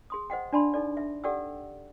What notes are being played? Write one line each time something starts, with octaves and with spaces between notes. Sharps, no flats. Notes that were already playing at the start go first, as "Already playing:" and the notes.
G#4 C6 D#6
C5 D#5 F#5 G5
D4 D5 A5 B5 C6
D#4 A4 D5
E5
G4 A4 D5 F#5 G5 E6